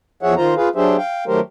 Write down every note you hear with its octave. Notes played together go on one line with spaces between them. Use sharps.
E2 F3 G#4 C#5 E5 F#5
D#3 F4 C5 A#5
F4 G#4 B4 F5
F#3 D4 G4 G#4 C5 E5
F5 G5
D#3 F#3 A3 G4 A#4 C5